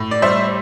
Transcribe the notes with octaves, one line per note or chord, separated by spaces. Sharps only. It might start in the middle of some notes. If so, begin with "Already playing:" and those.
Already playing: A2
D5
G3 C5 E5